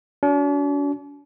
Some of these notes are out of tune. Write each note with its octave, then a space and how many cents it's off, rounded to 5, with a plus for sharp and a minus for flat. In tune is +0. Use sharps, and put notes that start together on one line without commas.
D4 -45 F#4 +0